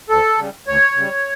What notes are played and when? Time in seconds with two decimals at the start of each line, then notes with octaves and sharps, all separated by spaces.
0.09 D2 A4
0.38 C#3 G3
0.67 D2 C#5
0.96 C#3 G3